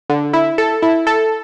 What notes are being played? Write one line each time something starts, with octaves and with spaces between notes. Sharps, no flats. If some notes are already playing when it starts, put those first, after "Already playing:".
D3
E4
A4
E4
A4